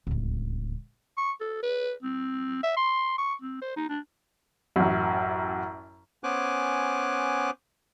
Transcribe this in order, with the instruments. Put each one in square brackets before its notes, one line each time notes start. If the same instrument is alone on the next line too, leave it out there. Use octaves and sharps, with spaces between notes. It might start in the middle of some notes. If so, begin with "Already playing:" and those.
[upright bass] D1 C#2
[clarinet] C#6
A4
B4
C4
E5
C6
C#6
C4
C5
D#4
D4
[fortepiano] A1 F#2
[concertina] B3 C#4 C5 G#5 D6 F#6